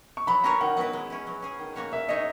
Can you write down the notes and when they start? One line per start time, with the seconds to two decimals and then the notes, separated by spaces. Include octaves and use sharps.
0.17 C#6
0.27 F#3 B5
0.44 C#4 F#4 A#4 C#5 A#5
0.61 D#3 F#5
0.77 F#3 B3 E4 B4
0.93 G#3
1.10 C#4 E4
1.27 F#3
1.42 C#4 G#4
1.59 D#3
1.76 A#3 C#4 F#4 C#5
1.92 A#3 E5
2.09 D#4 G#4 C#5 D#5